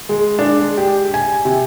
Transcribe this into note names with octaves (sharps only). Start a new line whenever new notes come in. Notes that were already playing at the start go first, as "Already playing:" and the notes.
G#3
D4
G#3
G4
G#5
C3